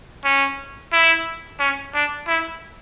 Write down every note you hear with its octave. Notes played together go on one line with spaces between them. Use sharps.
C#4
E4
C#4
D4
E4